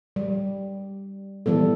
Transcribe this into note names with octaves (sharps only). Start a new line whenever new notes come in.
G3
E3 G3 B3 A4